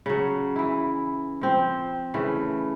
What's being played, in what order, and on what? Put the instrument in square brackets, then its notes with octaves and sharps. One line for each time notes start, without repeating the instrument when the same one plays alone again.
[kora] C#3 F#3
E3 E4
F3 C4
C#3 E3 A3